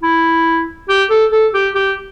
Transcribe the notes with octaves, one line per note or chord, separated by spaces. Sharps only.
E4
G4
A4
A4
G4
G4